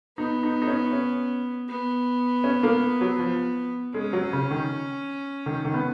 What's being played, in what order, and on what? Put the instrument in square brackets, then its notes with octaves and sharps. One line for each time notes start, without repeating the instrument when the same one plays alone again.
[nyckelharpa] B3 [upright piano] D#4
[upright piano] D#4
D#4
C#4
C#4
[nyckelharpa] B3
[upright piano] C#4
A#3
F#3
F3
[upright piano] G#3 [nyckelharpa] C#4
[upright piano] F#3
C#3
D#3
D#3
D#3
B3